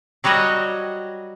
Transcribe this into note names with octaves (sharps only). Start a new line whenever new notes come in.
F#3 G3 F#4 C#5 D#5